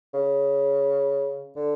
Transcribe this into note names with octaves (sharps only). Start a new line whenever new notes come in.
C#3
D3